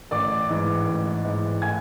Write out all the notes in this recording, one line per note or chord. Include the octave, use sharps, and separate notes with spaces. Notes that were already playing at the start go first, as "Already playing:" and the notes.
A1 D5 D6
G#2 E3
A1
G#2 E3
A2 G#5 G#6